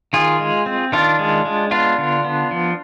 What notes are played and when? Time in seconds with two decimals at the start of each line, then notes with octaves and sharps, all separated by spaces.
0.13 D#3 F4 G#4
0.40 G#3
0.66 C4
0.92 D#3 D4 F4
1.19 G#3
1.45 G#3
1.71 B3 D4 F4
1.98 D3
2.24 B3
2.51 F3